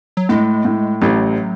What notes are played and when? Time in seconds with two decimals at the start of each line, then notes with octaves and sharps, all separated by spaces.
0.17 F#3
0.29 A2 G#3
0.65 A2
1.01 A1 F#3